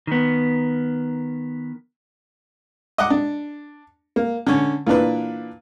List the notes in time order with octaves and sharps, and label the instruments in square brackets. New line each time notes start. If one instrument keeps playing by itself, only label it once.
[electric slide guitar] D#3 B3
[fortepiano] D#5 F#5 D6
D4
A#3
D3 C#4
A#2 E3 D4 B4